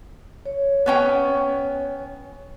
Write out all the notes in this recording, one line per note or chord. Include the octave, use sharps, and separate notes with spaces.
C#5
B3 C#4 G5